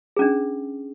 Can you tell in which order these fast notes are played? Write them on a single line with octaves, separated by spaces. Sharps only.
G#4 C#4 D4